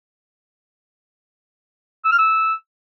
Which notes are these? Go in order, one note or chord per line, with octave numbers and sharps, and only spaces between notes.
E6
F6
E6